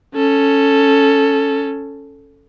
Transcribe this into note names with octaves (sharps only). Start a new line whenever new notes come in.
C#4 A4